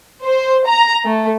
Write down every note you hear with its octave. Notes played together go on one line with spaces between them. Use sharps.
C5
A#5
A3